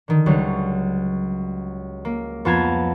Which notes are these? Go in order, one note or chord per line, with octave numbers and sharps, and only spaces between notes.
D3 D#3
C#2 F#3 G3
A#3
F2 B3 F4 A5 A#5 G#6